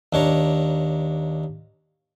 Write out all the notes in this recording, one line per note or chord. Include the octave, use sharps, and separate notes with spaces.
D#2 D4 C#5 A#5